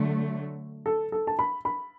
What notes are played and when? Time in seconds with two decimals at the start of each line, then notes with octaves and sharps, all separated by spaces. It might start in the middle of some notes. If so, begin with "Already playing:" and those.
Already playing: D3 F#3 A3
0.86 A4
1.12 A4
1.27 A5
1.39 B5
1.65 B5